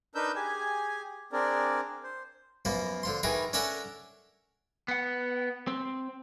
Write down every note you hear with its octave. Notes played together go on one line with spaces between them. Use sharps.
D4 D#4 A#4 B4 E6 G6
G4 G#4 G#5
C4 D4 G#4 A#4 D5
C5
F#2 F3 A#3 B3
D3 F3 C6
D#3 E3 G#4 A#4 B4
C#4 D4 A4 A#4 E5 F#5
B3 F#5
C4